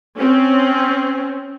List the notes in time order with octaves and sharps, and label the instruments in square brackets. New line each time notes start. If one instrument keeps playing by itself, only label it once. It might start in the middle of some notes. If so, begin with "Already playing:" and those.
[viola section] C4 C#4